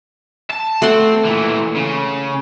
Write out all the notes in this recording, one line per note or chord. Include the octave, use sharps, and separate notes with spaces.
A5
A3 C4 F#5 C6
A#2 E3
C#3